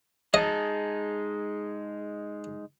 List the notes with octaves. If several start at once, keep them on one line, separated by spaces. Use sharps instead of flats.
G#3 D#4 G#4 D#5 A5